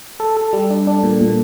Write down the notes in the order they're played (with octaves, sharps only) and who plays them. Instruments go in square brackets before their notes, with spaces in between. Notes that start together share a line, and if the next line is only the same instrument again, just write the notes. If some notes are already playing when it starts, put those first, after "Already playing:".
[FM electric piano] A4
A4
G3
D4
D4
A#2
A#2